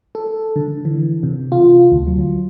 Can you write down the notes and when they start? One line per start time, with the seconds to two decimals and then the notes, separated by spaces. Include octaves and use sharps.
0.15 A4
0.56 D3
0.85 E3
1.23 C3
1.52 F4
1.92 D2
2.07 F#3